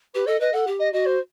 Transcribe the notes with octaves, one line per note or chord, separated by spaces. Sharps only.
G4 B4
A4 D#5
B4 D#5
A4 F#5
G4
D#5
F#4 D#5
C5